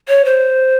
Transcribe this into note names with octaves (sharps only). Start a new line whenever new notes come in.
C#5
C5